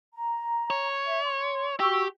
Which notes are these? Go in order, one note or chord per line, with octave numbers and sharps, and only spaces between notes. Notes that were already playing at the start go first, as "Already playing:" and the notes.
A#5
C#5
E5
C6
F#4 G4 C#6 E6